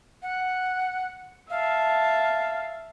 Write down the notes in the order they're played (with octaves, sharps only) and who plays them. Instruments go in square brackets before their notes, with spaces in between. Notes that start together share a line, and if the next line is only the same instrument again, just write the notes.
[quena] F#5
[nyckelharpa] E5 A5 [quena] F5